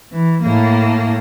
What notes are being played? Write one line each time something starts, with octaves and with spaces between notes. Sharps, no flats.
E3
A2 A#3